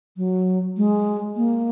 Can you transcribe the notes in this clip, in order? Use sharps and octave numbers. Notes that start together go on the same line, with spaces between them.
F#3
G#3
A#3